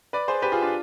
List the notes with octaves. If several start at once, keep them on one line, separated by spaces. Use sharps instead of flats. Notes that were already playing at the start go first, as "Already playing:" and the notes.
B4 D5
G#4 C5
G4 B4
F4 G#4
D4 F4